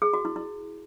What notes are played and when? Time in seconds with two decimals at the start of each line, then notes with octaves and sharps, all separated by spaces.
0.02 G#4
0.14 F#4
0.25 E4
0.36 E4